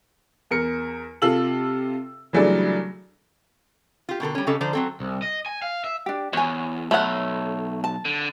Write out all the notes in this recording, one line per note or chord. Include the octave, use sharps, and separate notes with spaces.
E2 A#4 C#7
C3 F4 A4 E6 F#7
C#3 E3 F#3 G3 A3 D4
F4 G4
B2 D3 A4 A#4
G3 C#4
C#3 C#4 G4 A4 D#5
D3 F3 C5 D5 A#5
F#3 C4 A4
C2
D#5
G#5
F5
E5
D4 G4
E2 C#5 G#5
B1 A3 C#5 F#5 B5
A5
D3